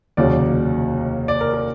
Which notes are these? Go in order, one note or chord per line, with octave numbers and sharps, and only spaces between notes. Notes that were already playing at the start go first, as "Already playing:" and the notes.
F1 D#2 C#3 F#3 D5
D5
A#4
A#4